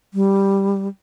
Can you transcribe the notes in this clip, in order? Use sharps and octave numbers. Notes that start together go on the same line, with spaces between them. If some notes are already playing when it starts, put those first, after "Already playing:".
G3